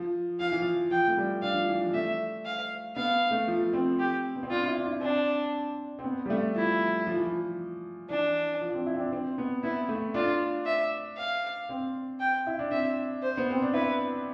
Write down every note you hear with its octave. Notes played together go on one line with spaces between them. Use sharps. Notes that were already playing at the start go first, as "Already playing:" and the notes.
Already playing: F3
F3 F5
E3
F3
F3 G5
A3
G3
D4 F5
F3
E3
F3
A3 E5
F5
B3 F5
A3
F3
C4
G4
B3
C4
D4 F4
E4
D4
E4
C4 D4
C4
B3
G3
A3
F3 E4
F3
E3
F3
E3 D4
F3
C4
E4
C4
D4
C4
B3
B3 E4
A3
D4 F4
E5
F5
C4
G5
E4
D4
C4 E5
C5
B3
C4
D4
E4 B4